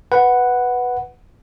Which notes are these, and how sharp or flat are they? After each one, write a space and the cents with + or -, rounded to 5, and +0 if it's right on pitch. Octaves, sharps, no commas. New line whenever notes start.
B4 +0 F#5 +0